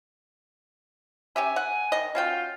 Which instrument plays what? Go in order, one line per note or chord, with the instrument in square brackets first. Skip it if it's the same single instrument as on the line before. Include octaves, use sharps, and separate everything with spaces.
[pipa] C#4 G4 E5 [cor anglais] G#5
[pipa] F#5
D#3 D#5
[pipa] C#4 F#4 G5 [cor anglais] F4